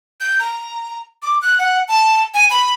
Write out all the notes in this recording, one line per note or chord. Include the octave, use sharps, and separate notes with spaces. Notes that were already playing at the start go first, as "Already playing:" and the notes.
G6
A#5
D6
F#6
F#5
A5
G#5
B5